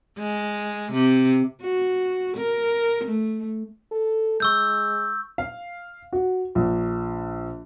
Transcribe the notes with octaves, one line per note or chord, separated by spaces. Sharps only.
G#3
C3
F#4
A#4
A3
A4
G#3 C#6 E6 G6
F5
F#4
A#1